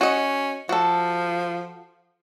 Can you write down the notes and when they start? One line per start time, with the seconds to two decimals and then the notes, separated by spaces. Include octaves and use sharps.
0.01 C#4 F#4 D#5
0.69 F3 F#4 A4